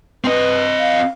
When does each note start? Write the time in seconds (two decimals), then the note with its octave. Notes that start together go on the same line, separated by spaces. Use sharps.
0.24 C4 B4 D#5
0.79 F5